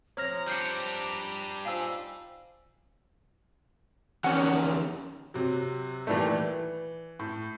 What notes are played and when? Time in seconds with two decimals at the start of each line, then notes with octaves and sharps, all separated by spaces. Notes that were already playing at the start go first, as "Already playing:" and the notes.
0.17 F3 C4 C#5 A#5 F6 A#6
0.48 G3 D4 G6 C7 C#7
1.65 D#4 F4 C5 F5 G#5 E6
4.24 E2 D#3 C#4 F#5
5.34 C3 F#3
6.07 A#2 D#3 E3 G3 A3
6.29 E3
7.19 A2